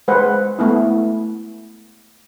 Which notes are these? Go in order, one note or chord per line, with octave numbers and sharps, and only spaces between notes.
G#3 B4 C5 F#5
A3 B3 E4